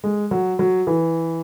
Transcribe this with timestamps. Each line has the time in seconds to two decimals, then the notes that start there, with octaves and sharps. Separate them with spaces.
0.04 G#3
0.31 F#3
0.59 F#3
0.87 E3